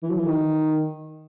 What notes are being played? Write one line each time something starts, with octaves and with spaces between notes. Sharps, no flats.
E3
F#3
E3
D#3